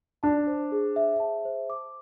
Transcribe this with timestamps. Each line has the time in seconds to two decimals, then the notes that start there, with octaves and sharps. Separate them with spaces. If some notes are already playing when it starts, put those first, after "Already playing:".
0.23 D4 A5
0.47 C5
0.72 G#4
0.96 E5
1.20 A5
1.45 C5
1.70 D6